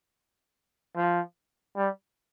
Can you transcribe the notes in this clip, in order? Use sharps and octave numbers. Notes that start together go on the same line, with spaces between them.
F3
G3